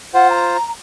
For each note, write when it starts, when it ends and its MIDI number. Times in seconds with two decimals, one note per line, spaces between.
0.14 0.57 65
0.14 0.57 72
0.14 0.28 78
0.30 0.68 82